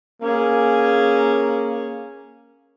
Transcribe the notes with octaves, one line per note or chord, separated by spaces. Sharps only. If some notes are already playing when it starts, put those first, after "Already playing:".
A#3 C#4 G#4